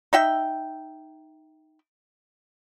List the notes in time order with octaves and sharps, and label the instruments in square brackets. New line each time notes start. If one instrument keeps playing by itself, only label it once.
[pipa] D#4 E5 G5